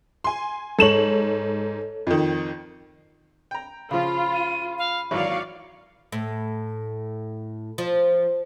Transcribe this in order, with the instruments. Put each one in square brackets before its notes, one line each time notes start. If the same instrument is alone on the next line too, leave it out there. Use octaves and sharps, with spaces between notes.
[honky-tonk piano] G#5 C6
[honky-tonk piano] G#2 E7 F#7 [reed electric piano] A4 C#5
[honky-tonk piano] F2 D#3
[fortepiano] G5 A#5
[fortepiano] C#3 F3 [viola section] F4 [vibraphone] B5
[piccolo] D#7
F5
[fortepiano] G#1 E3 F#3 [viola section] D5 F5 [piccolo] C#6
[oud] A2
F3